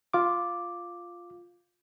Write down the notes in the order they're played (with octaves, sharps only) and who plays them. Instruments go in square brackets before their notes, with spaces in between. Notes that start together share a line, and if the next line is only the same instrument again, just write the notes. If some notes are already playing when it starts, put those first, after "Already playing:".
[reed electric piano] F4 D6